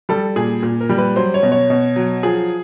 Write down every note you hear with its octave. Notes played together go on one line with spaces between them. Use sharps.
G3 A4
A#2 G#4
A#2
A#4
G3
B4
F#3 C5
C#5
B2
C#5
B2
F#3
F3 G#4